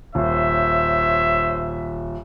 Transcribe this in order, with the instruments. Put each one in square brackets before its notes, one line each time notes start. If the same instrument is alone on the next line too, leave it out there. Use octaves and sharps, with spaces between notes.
[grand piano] D#1 [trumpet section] C5 C#5 E5